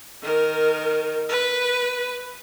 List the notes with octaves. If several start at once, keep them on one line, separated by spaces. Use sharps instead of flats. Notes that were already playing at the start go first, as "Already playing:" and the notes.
D#3 A#4
B4